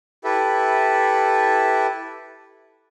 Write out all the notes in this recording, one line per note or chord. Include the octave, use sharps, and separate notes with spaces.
E4 G4 A4 B4 E5